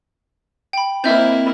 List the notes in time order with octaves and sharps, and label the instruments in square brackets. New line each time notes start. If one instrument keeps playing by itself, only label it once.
[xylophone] G5 B5
[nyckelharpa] A#3 E4 [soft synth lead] C4 [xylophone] D#5 E5 G6